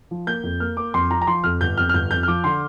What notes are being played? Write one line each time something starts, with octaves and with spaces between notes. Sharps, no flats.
F3
A#3 G6
F2
A#3 F6
A#3 D6
F2 C6
F3 A#5
A#5
F3 C6
F2 F6
G1 G6
F2 F6
F6
G1 G6
F2 G6
F6
F3 D6
D3 C6